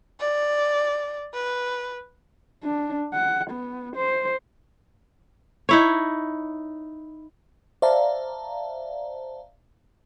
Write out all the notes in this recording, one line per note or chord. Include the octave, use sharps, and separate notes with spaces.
D5
B4
D4
F#5
B3
C5
D#4 E4 C#5
C5 D5 E5 F5 A5 A#5